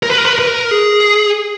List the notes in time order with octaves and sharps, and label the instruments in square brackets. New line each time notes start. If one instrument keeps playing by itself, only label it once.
[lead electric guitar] A#4
B4
A#4
B4
A#4
B4
A#4
G#4